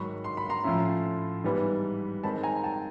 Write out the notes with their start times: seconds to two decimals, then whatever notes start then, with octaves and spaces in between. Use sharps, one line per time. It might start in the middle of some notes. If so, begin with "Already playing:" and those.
Already playing: G#2 D#3 F#3 B5 C#6
0.24 C6
0.37 B5
0.49 A#5 C6
0.64 A2 F3 A3 C#4 E4
1.44 G#2 E3 G3 B3
2.23 D#3 G#3 C4 A5 B5
2.43 G#5 A#5
2.63 G5 A5